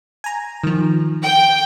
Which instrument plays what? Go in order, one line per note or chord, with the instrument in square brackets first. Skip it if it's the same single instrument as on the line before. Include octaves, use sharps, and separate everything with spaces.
[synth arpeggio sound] G#5 A#5
D#3 F3
[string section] G5